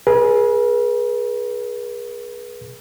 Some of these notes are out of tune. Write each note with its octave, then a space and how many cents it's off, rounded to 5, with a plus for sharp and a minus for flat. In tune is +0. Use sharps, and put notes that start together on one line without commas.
G#4 +5 B4 -40